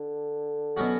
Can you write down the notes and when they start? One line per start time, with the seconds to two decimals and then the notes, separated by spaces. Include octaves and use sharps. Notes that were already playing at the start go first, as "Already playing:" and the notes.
Already playing: D3
0.77 B2 F#3 C#4 F#4